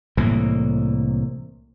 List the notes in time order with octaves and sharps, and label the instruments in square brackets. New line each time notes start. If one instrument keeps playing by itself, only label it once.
[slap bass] C2 A2 E3 A#3